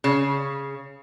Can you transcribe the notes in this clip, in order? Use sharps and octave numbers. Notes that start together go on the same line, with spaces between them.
C#3